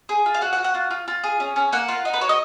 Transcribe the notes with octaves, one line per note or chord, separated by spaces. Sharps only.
G#4
F4
F5
F#4 F#5
F#5
F#4
F#5
F4
F4
F4
G#4
C#4
C#4
A#3 F#5
F4
D#4
B4
F#4 C#5
D#5